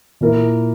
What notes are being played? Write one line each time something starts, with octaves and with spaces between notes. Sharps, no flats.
A#2 A#3 E4 A#4